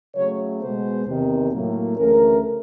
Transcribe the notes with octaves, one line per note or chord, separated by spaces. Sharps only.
C#3 F#3 A3 C#5
B2 G#3 B3 C5
E2 C3 D#3
A2 F#3 A#3
D2 C#3 E3 A3 C#4 A#4